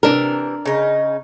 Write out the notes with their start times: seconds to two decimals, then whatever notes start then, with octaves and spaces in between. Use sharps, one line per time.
0.03 C3 E3 D4 A#4
0.65 C#3 D#4